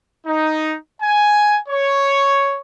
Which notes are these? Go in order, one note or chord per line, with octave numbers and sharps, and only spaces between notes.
D#4
G#5
C#5